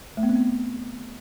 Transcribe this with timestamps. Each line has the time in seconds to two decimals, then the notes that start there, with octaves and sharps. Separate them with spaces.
0.17 A3
0.23 B3
0.29 C4
0.35 B3